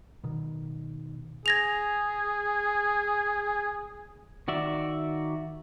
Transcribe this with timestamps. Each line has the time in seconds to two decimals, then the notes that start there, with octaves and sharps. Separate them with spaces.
0.24 B2 D#3
1.46 G#4 G#6 A#6 F7
4.48 D#3 F#4 D5 E5